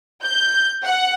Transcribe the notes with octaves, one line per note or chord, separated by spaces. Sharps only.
G6
F#5